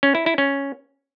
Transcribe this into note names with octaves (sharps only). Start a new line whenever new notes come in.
C#4
E4
E4
C#4